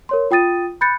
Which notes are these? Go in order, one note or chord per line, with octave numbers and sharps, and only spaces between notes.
A#4 C#5 C6
F4 G5 D#6 A6 D#7
B5 F#6 G6 A6 C#7